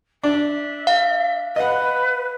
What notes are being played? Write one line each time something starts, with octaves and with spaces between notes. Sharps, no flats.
D4 E5
F5
B4 D#5 F#5